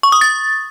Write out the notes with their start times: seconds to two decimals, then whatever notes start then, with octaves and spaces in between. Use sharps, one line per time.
0.03 C#6
0.12 D#6
0.21 A6